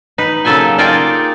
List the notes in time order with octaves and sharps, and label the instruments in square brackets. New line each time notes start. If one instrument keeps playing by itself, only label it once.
[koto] D#4 B4
C#3 F#3 A#3 A4 G5 G#5
D#4 F4 G#4 A#4 D5 G5